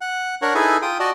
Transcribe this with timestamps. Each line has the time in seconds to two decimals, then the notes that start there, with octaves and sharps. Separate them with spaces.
0.01 F#5
0.42 D4 A#4 C#5 F#5
0.55 D#4 E4 G#4 A4 B4 G#5
0.82 F4 G5 D#6
0.99 F#4 D5 D#5 A5